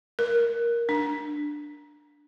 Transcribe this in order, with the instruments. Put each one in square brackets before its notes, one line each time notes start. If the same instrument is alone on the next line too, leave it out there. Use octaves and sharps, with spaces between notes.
[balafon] A#4
D4